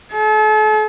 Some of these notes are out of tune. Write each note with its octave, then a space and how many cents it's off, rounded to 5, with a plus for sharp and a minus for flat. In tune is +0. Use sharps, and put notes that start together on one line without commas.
A4 -40